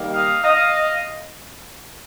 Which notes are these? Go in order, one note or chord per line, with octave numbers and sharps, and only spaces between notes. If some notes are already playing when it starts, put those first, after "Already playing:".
Already playing: D#3 G3 A#3
D#5 F5
D#5 F5